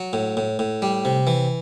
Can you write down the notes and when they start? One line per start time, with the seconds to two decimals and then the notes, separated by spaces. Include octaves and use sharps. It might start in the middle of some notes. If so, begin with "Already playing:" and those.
Already playing: F#3
0.13 A2
0.37 A2
0.59 A2
0.82 G3
1.05 C3
1.27 E3